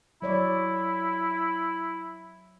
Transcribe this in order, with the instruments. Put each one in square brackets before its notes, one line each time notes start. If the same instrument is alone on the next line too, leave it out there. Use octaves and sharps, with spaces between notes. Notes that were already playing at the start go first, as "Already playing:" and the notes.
[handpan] F#3 C#5 D5 [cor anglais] E4